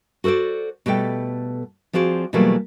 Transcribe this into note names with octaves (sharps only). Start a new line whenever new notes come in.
F#4 A4 A#4 C5 D5
B2 G3 A3 A4 G5
F3 C4 F#4 G#4 D5
B2 E3 F#3 G3 A3 A#3